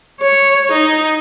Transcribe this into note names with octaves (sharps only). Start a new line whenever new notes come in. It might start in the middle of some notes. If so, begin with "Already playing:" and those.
C#5
D#4